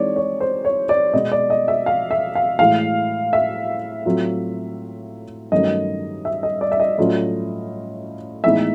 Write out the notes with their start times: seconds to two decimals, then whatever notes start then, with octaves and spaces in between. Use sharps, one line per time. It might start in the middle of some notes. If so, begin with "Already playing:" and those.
Already playing: E3 G#3 C4 D#4 C#5 D5
0.16 C#5
0.40 C5
0.65 C#5
0.89 D5
1.13 B2 G#3 B3 D#5
1.32 D5
1.50 D#5
1.68 E5
1.86 F5
2.11 E5
2.35 F5
2.59 A2 E3 G#3 F5
3.33 E5
4.06 A2 F#3 A3 C4 F4
5.52 G2 D#3 F#3 A3 C#4 D#5
6.25 E5
6.43 D#5
6.61 D5
6.72 E5
6.80 D#5
6.98 A2 F#3 A3 C#4 F4
8.44 A2 E3 G#3 B3 D#4 E5